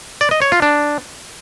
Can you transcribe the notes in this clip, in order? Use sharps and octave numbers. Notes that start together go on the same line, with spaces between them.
D5
D#5
C#5
F4
D4